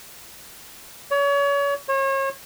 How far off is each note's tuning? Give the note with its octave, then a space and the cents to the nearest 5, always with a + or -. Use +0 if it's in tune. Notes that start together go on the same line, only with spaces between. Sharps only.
C#5 +35
C#5 -35